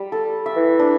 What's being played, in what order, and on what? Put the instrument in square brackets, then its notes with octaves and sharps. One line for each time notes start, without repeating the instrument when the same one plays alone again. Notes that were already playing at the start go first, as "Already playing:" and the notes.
Already playing: [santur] G3
A4
E5
[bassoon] E3
[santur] D4